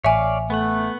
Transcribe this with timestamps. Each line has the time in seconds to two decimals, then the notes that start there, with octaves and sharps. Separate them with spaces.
0.04 A1 C#5 D5 E5 F5 G#5
0.50 A3 B3 F#5